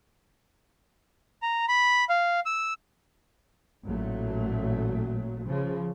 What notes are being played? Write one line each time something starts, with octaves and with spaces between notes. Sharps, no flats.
A#5
B5
F5
E6
A1 A#2 F#3 A3
C#3 F3